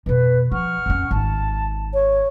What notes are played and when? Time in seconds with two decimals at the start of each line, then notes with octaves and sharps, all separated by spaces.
0.06 F2 B2 B4
0.51 F3 F#5 C#6 F6
0.86 F2 C#4
1.11 G#1 A5
1.94 C#5